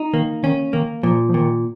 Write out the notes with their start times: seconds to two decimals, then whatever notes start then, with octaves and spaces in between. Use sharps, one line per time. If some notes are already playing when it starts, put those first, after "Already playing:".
Already playing: D#4
0.13 D#3 A#3
0.43 D#3 C#4
0.73 D#3 A#3
1.03 A#2 F3
1.29 F3
1.34 A#2 D#3